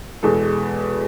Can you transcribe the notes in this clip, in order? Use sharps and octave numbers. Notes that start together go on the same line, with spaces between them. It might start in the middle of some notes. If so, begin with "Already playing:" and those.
E2 B2 G#3 A4